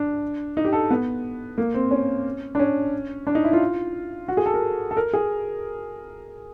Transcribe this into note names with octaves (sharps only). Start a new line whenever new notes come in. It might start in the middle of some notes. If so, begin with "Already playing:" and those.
Already playing: D4
D#4
G4
A4
B3
A#3
C4
C#4
D4
C#4
D4
D#4
E4
F4
F#4
G#4
A4
A#4
A4
A#4
G#4